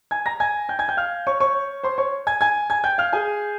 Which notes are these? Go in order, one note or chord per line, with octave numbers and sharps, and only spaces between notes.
G#5 G#6
A#5 A#6
G#5 G#6
G5 G6
G#5 G#6
G5 G6
F5 F6
C#5 C#6
C#5 C#6
C5 C6
C#5 C#6
G#5 G#6
G#5 G#6
G#5 G#6
G5 G6
F5 F6
G#4 G#5